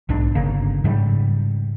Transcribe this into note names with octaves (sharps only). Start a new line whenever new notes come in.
B1 G#2 D4
G1 C#3 A#3
G#2 C#3 F#3 G3